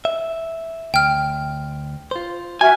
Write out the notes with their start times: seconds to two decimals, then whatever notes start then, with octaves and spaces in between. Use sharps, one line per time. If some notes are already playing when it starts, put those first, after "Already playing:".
0.05 E5
0.94 D2 G5 F6
2.11 F4 C5
2.61 F#4 E5 G#5 F6